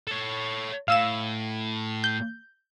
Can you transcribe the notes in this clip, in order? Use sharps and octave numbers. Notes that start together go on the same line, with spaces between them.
A4 C#5
A2 F5 E6 E7
G6